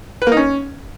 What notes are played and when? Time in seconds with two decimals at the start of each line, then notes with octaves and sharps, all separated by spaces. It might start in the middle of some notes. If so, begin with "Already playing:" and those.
0.22 B4
0.27 A#3
0.32 D#4
0.37 C#4